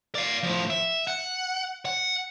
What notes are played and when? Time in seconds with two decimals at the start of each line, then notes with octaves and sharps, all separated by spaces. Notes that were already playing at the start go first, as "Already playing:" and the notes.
0.15 D5 F5
0.43 A2 F3
0.70 E5
1.07 F#5
1.85 F#5